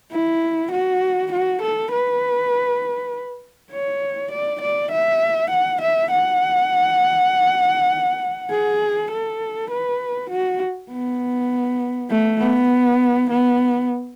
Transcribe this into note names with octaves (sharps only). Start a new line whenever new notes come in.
E4
F#4
F#4
A4
B4
C#5
D5
D5
E5
F#5
E5
F#5
G#4
A4
B4
F#4
B3
A3
B3
B3